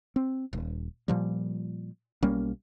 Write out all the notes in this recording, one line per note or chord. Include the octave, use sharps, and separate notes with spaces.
C4
D#1
A#2 F3 G3
B1 G3 A#3 C#4